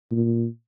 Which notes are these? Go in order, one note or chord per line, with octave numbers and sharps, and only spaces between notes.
A#2